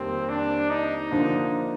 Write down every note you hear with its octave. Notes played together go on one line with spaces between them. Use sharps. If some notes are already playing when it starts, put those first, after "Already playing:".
Already playing: F2 C3 D#3 G3 A#3 C4
D4
D#4
D3 F3 A#3 D4